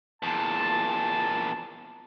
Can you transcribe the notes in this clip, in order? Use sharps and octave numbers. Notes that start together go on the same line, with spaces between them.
E2 A#2 A5